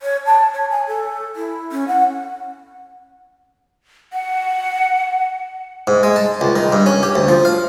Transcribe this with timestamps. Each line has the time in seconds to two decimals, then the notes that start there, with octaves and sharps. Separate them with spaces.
0.01 C#5
0.26 A5
0.53 C#5
0.70 G#5
0.87 A4
1.36 E4
1.72 C#4
1.88 F#5
4.13 F#5
5.87 G#2
6.03 G#3
6.16 A5
6.41 C#2
6.56 D#3
6.72 G2
6.86 C#4
7.03 G4
7.15 D2
7.28 F3
7.45 F5